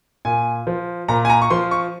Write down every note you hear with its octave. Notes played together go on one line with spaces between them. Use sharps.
A#2 G#5
F3
A#2 A#5
G#5
A#5
C#6
F3 C6
C#6